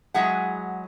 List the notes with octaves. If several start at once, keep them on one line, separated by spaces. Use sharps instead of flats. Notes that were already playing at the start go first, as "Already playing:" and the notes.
F#3 G#3 E4 G#4 F#5